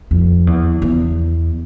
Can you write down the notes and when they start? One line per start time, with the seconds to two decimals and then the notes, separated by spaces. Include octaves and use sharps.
0.11 F2
0.47 E2
0.82 E2